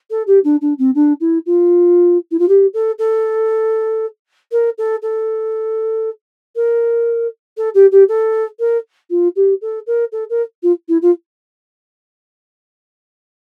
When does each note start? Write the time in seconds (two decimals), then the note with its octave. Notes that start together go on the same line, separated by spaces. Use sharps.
0.10 A4
0.27 G4
0.44 D4
0.61 D4
0.78 C4
0.95 D4
1.20 E4
1.46 F4
2.31 E4
2.39 F4
2.48 G4
2.73 A4
2.98 A4
4.52 A#4
4.78 A4
5.02 A4
6.55 A#4
7.57 A4
7.74 G4
7.91 G4
8.08 A4
8.59 A#4
9.10 F4
9.36 G4
9.61 A4
9.87 A#4
10.12 A4
10.30 A#4
10.63 F4
10.88 E4
11.02 F4